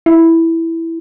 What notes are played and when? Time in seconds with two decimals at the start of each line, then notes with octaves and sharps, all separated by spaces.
0.06 E4